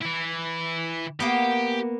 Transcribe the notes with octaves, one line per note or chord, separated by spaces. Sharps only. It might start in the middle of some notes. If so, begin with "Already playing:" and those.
E3 E4
A#3 B3 G4